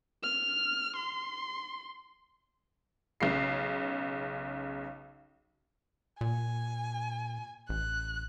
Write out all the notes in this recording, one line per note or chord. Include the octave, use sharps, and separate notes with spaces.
F6
C6
B1 C#3 C7
A#2 G#5
A1 F#6